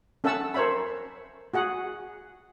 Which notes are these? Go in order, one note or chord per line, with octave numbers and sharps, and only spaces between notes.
C#4 A4 E5 F#5 A5 E6
A#4 C5 C#5 E5 B5
F#4 G#4 F#5